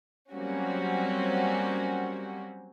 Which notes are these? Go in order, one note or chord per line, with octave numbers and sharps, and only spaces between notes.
F#3 G3 A#3 C4 C#4 F#4